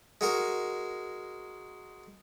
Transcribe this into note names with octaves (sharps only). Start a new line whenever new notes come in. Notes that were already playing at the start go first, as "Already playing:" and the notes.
G#3 F#4 A#4